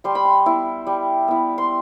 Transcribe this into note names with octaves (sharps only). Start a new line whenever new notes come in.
G3 C6
B5
C6
B3 E4
G3
B3 E4
C6